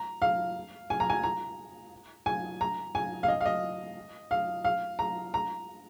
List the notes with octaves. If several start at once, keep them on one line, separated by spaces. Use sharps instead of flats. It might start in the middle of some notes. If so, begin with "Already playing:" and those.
Already playing: A#5
F5
G#5
A#5
G#5
A#5
G#5
A#5
G#5
F5
D#5
F5
D#5
F5
F5
A#5
A#5